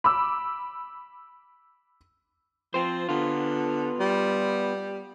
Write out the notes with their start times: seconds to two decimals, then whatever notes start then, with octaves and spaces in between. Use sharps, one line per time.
0.04 B5 D6 E6
2.74 F3 C4 C5
3.09 D3 B3 F4
4.00 G3